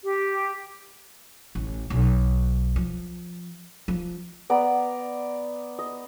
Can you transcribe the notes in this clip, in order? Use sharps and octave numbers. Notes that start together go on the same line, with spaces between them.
G4
A1
B1
F3
F3
B3 D5 A#5
D#5